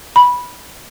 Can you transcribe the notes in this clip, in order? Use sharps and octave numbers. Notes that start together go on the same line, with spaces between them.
B5